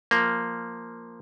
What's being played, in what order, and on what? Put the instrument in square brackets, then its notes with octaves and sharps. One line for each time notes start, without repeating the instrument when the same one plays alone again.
[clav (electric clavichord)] F3 A#3